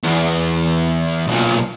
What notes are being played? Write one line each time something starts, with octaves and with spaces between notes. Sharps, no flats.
E2
B1 A#2